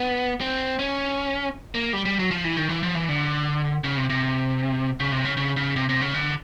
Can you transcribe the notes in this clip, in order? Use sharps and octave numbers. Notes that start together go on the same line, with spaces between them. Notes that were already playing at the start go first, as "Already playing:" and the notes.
Already playing: B3
C4
C#4
A#3
G3
G3
F#3
F3
E3
D#3
E3
F3
E3
D3
C#3
C3
C3
C#3
C3
C#3
C#3
C#3
C3
C3
C#3
D3